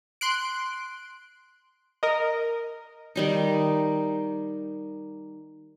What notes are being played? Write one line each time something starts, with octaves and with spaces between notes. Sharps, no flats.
C6 F#6 D7
A#4 D#5
D#3 G3 D#4